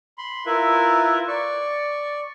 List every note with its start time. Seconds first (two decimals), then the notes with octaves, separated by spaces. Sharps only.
0.18 B5 C6
0.46 E4 F4 A#4 B4 E5
1.28 D5 C#6